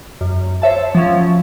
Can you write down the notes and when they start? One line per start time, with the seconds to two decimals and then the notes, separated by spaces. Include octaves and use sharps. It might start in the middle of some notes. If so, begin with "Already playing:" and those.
0.21 F#2
0.62 C5 C#5 E5 A5
0.95 F3 F#3 C#4